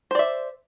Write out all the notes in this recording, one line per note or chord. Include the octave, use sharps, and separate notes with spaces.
C5 D5 E5